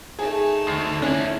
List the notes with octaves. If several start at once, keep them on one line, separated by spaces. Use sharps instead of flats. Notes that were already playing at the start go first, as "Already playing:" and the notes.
A3 D#4 G#4
D2 C7
C#4 D4 E4